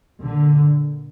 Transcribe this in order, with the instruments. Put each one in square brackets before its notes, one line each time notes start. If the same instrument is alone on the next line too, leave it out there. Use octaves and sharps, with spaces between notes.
[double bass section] A#2 D3